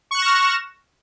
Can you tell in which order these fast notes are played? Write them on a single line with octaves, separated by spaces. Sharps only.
C#6 F#6 E7 A#6 F6